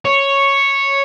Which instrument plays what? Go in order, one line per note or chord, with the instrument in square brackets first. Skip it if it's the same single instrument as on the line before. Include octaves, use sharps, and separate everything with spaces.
[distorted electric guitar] C#5